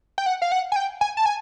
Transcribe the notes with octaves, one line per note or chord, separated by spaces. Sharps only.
G5
F#5
F5
F#5
G#5
G5
G#5
A5
G#5